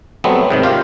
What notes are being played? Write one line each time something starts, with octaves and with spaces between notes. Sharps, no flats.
F#3 G3 A3 B3 C4
G#2 C3 D#3
F4 G4 F5